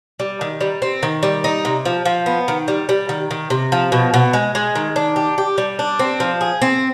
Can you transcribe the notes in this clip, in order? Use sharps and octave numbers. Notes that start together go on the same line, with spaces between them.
G3
D#3
G3
C4
D#3
G3
D#4
C3
F3
F3
B3
D#3
G3
G3
D#3
D#3
C3
F3
B2
B2
G#3
G#3
D#3
D4
G4
G4
G3
D4
C4
F3
G#4
C4